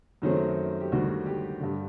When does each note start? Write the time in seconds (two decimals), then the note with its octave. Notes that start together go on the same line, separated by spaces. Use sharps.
0.22 F#2 D#3 F#3 A3 C4
0.81 G4
0.92 D2 C3 D#3 G3 F#4
1.26 G4
1.60 G2 D3